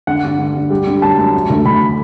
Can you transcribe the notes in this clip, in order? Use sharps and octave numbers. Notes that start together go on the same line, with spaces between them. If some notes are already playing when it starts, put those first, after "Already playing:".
D3 F#5
G2
D3
G2
G3
D3
F#2 A5
F#2
F#3
D2
D2 B5